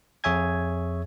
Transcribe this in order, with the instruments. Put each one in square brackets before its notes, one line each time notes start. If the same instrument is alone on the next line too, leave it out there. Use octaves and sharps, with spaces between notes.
[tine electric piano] F2 G#4 C#5 E5 G#5 G#6